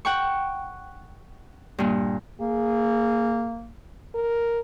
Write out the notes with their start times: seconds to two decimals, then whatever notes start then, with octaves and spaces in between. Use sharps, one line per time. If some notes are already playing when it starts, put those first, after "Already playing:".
0.05 F#5 G5 C#6
1.78 G2 A#2
2.40 A#3 G#4
4.15 A#4